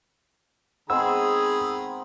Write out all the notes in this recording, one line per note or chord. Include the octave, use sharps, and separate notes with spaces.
D#3 G#3 B3 C4 G#4 A#5 B5 E6